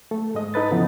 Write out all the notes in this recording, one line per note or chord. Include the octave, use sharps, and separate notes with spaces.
A3 A4
G#2 G#3 D#5
D#4 A4 B4 A6
E2 C#3 E3 F3 B3